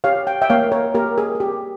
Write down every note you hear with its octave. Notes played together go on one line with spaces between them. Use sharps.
G4 C#5 F5
G5
E5 G5
A#3 C#5 F5
A#4 C#5
A#3 G4 A#4
G#4
G#4
G4